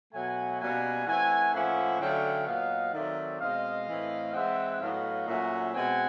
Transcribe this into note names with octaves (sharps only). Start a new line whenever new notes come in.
B2 F#3 A3 F#5 G#5
B2 G3 A#3 C#4 F#5 G#5
E3 A3 C4 F#5 G#5
A2 F3 A#3 C#4 E5 F#5
D3 F#3 A3 C#4 F5 G5
A#2 F#3 B3 D#5 F5
D#3 F#3 A3 C4 D5 E5
B2 G#3 C4 D#5 F5
A2 E3 A3 C4
E3 G#3 C4 E5 F#5
A2 F#3 B3 D#5 F5
A#2 F#3 A3 C#4 E5 F#5
B2 G#3 C4 F#5 G#5